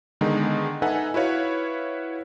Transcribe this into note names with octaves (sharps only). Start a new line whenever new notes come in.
D3 D#3 G#3 B3 D#4
D#4 A4 B4 E5 F#5 G#5
E4 F#4 B4 C#5 F5